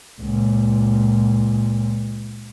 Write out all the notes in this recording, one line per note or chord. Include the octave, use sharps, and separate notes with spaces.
C#2 A#2